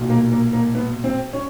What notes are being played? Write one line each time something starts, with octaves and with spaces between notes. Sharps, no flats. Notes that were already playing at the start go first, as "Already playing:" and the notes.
Already playing: B1 A#2
A#3
A#3
A#3
B3
C4
C#4